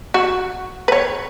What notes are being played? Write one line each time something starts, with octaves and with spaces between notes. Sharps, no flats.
F#4
B4
C#5